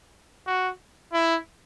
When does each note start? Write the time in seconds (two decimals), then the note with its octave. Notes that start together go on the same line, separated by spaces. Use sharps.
0.47 F#4
1.13 E4